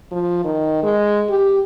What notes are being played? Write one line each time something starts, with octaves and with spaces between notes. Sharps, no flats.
F3
D#3
G#3
G4